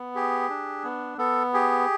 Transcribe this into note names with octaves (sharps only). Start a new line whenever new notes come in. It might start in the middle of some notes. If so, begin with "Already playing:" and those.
Already playing: B3
G4 G#4
D4
B3
B3 A4
G4 G#4